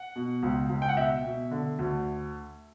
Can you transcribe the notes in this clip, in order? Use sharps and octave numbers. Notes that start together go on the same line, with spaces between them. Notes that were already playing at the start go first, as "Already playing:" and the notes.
Already playing: F#5
B2
C#2
C#2
G5
F#5
B2 E5
B2
D3
D2